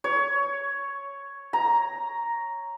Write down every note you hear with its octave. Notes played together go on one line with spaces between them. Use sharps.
C#5
A#5